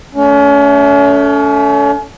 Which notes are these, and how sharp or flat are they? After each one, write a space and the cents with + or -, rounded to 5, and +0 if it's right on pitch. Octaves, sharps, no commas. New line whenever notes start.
A3 -5 C#4 +35